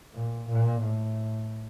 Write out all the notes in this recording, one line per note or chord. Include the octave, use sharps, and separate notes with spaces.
A#2
A#2
A2